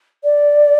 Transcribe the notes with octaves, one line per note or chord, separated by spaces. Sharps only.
D5